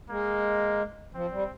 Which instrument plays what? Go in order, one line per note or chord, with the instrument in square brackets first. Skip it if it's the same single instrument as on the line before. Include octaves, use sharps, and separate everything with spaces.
[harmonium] G#3 [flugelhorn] A#3
[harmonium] F3 [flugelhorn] C4
[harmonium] G3